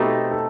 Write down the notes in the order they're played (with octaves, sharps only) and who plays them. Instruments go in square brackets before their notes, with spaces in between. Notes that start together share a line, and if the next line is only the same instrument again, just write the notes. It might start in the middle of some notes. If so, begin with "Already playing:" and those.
Already playing: [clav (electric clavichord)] B2 A3 C4 D#4 [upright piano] G4
[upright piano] A4